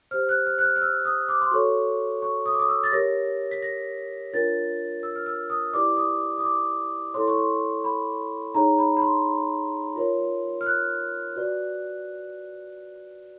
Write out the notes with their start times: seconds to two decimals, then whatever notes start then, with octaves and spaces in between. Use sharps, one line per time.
0.11 G4 C5 F6
0.29 F#6
0.46 F6
0.58 F#6
0.64 F6
0.76 F6
0.82 E6
1.05 D#6
1.29 D6
1.41 C6
1.51 F#4 A4 C#5 C#6
2.22 C#6
2.46 D#6
2.53 D6
2.60 D#6
2.69 E6
2.83 A6
2.92 G4 A#4 C#5 A#6
3.51 B6
3.63 A#6
4.33 D4 F4 A#4 C#5 A6
5.03 E6
5.16 F6
5.26 E6
5.50 D#6
5.73 E4 G4 B4 D5 D6
5.97 D#6
6.38 D#6
6.44 D6
7.14 E4 A4 C#5 C6
7.28 C#6
7.38 C6
7.84 B5
8.54 D#4 G#4 C#5 A#5
8.78 B5
8.97 B5
9.01 C6
9.96 F4 A#4 C#5
10.61 F6
10.66 F#6
11.36 F#4 B4 D5